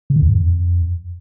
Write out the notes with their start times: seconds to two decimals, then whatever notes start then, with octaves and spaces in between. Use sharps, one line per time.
0.10 C#3
0.16 D3
0.22 E2
0.29 G2
0.35 F2